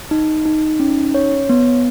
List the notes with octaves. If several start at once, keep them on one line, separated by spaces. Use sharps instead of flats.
D#4
D#4
C#4
C#5
B3